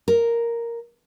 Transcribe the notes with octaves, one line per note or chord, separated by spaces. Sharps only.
A#4